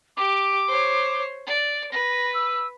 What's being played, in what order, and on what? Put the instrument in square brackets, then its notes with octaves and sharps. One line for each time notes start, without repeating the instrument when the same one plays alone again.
[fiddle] G4 [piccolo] D6
[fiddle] C5 C#5
D5
[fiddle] B4 [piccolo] A#6
[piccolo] E6